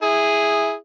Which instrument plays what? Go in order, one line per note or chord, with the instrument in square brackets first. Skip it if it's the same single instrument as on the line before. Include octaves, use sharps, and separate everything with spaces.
[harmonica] E4 G#4